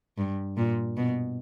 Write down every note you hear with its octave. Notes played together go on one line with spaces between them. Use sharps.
G2
A#2
B2